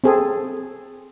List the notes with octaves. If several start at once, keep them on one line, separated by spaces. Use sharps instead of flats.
C4 G#4 A4